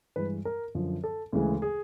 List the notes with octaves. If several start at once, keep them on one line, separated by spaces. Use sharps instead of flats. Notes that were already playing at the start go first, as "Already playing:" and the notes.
G2 E3 G#3 B4
A#4
F#2 D3 F3
A4
D2 C#3 E3 G#3
G#4